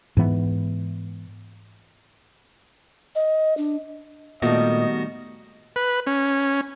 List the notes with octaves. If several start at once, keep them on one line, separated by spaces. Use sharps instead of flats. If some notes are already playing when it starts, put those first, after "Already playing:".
G#2 E3 B3
D#5
D4
A#2 D#3 G3 A3 B3 F#4 D#5 A#6
B4
C#4